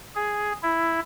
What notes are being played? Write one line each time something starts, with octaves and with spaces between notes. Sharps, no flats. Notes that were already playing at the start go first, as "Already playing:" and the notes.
G#4
E4